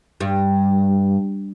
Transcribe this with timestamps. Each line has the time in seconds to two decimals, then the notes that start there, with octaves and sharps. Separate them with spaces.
0.21 G2